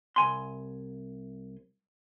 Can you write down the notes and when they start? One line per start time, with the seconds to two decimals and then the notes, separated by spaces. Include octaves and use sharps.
0.16 C2 G#5 C6